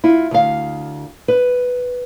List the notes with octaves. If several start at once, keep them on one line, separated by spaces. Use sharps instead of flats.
E4 F4
D2 F5
B4